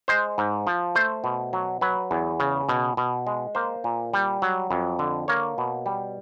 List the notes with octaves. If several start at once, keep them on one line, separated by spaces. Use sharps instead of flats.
G#3 C5
G#2
F3
A3 C5
B2
F#3
F#3 B4
E2
C#3
B2
B2
G#3
A#3 C5
A#2
G3
F#3
F2
D3
A#3 C#5
B2
G3